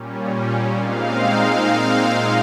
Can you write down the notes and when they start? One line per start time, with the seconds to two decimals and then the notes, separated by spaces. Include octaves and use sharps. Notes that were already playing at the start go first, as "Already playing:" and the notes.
Already playing: A#2 G3 C#4
0.77 A#2 G#3 C4 D#4 F5